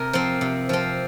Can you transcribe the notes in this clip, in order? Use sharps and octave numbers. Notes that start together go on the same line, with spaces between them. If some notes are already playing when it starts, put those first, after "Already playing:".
Already playing: C3 A#4
F3 C4
C3
F3 C4